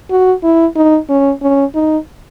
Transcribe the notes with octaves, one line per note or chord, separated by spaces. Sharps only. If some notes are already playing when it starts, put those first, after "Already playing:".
F#4
E4
D#4
C#4
C#4
D#4